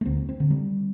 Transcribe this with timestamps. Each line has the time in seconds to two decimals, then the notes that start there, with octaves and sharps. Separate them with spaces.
0.01 A3
0.05 D2 C4
0.29 C4
0.40 D3
0.50 G3